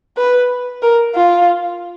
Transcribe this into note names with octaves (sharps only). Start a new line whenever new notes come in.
B4
A#4
F4